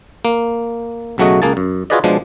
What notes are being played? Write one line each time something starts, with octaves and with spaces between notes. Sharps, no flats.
A#3
B1 C#3 F#3 A3 F#4 D#5
C#2 A#3 G#4 A5
F#2
F4 F#4 G#4 B4 D5 D#5
B2 F3 G#3 D4